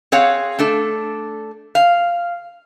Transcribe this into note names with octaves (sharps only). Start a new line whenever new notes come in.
C4 G#4 C#5 F5 F#5
A3 D4 A4
F5